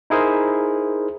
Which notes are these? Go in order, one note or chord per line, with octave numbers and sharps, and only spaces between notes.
D#4 E4 G#4 A#4 C5